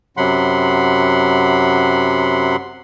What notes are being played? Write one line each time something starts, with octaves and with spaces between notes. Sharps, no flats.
F#2 C3 F#3 F#5 B5 C6